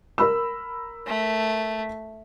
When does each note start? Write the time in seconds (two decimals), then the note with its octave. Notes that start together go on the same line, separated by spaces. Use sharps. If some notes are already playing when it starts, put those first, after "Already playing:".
0.18 A#4 B5 E6
1.07 A3